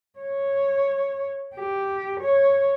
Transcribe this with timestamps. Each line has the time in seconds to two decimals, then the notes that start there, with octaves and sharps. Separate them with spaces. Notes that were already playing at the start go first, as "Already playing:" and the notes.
0.19 C#5
1.55 G4
2.21 C#5